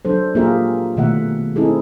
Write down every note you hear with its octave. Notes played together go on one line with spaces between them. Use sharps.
F#3 D4 A4 C5
A#3 F4 G4 G#4 A#4 E5
B2 D#3 A3 B3 E5 F#5
C4 D#4 E4 G#4 A4